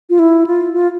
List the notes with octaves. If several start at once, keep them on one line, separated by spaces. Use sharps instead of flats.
F4
E4
F4
F4